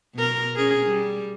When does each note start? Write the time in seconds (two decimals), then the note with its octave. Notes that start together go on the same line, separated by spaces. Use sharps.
0.14 B2 A#4
0.55 C#4 G#4 A#4
0.86 G3